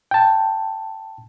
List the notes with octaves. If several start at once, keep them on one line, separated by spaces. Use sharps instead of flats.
G5 A5